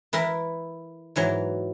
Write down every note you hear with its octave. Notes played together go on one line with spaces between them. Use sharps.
E3 E4 A#4 B4
G#2 E3 F#3